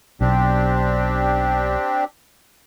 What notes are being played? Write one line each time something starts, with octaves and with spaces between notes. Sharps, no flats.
B1 C4 D4 G4